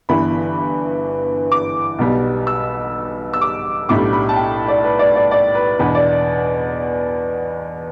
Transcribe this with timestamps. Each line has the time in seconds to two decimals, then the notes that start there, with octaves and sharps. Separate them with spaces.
0.09 G1 G2 E3 B3 B5
1.52 D6
1.99 B1 B2 G3
2.47 E6
3.34 E6
3.41 D6
3.89 B1 A2 G3 D4 D6
4.13 B5
4.29 A5
4.36 G5
4.68 D5
4.84 B4
4.99 D5
5.16 D5
5.31 D5
5.55 B4
5.79 E2 B2 B3 D4 B4
5.95 D5